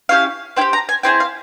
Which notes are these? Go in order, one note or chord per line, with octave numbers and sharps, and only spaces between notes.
C#4 E4 G4 F5
C4 E4 G4 G5
A#5
G#5
C4 E4 G#4 G5
F5